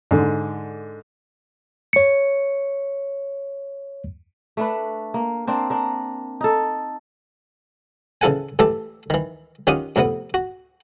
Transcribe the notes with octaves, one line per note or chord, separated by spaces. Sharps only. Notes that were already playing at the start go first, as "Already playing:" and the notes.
G#2 D3
C#5 C#7
A3 D4 B4
A#3
A#3 C4 D4
D4 A#4
D#4 A4
C#3 E3 E4 A4 F#5 G#5
A2 E3 G4 A4 E5 A5
D#3 E3
D#3 C#4 F4 G4 F#5 D#6
F2 A2 C3 B3
F#4